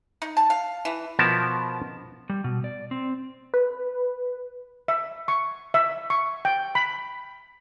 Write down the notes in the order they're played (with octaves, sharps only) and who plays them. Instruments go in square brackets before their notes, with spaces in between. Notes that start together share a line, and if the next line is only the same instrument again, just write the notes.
[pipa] D#4
A5
F5
E3
[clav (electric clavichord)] B2 F3 B3 A#4 A5
[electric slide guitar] G3
B2
D5
C4
[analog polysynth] B4
[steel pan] E5
C#6
E5
C#6
G5
B5